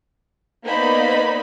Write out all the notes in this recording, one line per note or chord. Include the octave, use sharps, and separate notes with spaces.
A#3 B3 D#4 C5 D5 B5